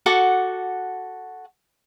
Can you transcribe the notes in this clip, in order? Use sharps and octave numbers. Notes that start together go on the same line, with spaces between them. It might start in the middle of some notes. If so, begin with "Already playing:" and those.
F#4 A4 F#5 D6